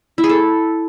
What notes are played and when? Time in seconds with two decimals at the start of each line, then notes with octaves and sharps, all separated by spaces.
0.18 E4
0.24 G#4
0.29 A4